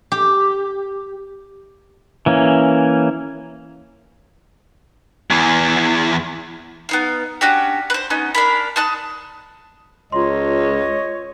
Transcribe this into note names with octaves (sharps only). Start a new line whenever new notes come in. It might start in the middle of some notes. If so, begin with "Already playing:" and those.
G4
E3 A#3 C#4
E2 E3
B3 D#4 F5
C#4 D4 F#4 G4
B4 C5
B3 C#4 D#4
D4 A#4 B5
D#4 A5 F#6
C#2 F4 C#5 D#5 C6